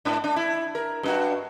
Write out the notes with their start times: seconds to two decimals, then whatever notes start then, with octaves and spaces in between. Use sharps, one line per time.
0.05 G#2 D4
0.24 D4
0.36 E4
0.75 A#4
1.03 G2 D4 F#4